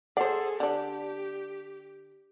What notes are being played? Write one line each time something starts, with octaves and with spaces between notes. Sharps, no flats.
G#4 A4 C5 D5 F#5
D3 D4 G4